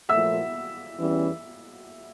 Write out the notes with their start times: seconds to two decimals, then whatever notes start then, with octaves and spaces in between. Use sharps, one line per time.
0.09 A#2 F3 A3 E5 E6
0.98 E2 E3 G3 C#4